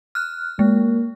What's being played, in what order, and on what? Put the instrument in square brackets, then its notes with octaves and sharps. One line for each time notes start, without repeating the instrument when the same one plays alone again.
[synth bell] F6 F#6
[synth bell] G#3 [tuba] A#3